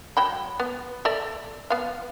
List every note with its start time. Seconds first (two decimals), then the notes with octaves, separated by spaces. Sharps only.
0.17 F#3 G5 B5
0.60 B3
1.05 A4 D5 E5
1.70 B3 F5